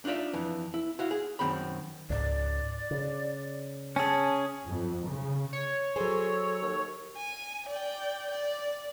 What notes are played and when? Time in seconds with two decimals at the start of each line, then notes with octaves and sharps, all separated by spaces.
0.05 D4 D#4 F4 D5 E5
0.33 F2 E3
0.74 E4
0.99 E4 F#4 F5
1.11 G#4
1.39 F#2 D#3 C4 B5
2.10 C#2 G#2 D5
2.91 C#3
3.96 C#4 G#4 A5
4.68 F2
5.07 C#3
5.53 C#5
5.96 F#3 G#4 A4 C5
6.62 D#2
7.16 G#5
7.69 D5 G5
8.31 D5